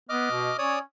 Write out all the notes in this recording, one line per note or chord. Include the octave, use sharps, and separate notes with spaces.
B3 D#5 D6 F6
B2
C#4 C#5 D5 D#6